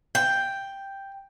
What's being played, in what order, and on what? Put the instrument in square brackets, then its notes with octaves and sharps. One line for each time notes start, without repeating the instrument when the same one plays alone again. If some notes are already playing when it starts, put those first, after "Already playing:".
[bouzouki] G5